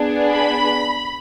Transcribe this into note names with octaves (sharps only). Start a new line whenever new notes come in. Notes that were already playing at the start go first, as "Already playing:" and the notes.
Already playing: B3 D4 G#4
B5